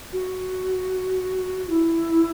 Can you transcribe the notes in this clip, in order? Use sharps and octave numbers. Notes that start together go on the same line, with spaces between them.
F#4
E4